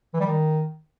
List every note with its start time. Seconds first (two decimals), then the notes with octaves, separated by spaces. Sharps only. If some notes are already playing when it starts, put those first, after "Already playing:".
0.14 E3
0.20 G3
0.27 D#3